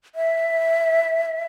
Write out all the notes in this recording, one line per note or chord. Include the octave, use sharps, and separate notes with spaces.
E5